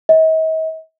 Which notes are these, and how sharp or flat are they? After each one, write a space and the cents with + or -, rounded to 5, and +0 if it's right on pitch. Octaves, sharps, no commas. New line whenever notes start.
D#5 +45